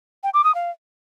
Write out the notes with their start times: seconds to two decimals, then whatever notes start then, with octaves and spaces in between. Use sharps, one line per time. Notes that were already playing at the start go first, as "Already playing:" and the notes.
0.23 G5
0.34 D6
0.44 D#6
0.55 F5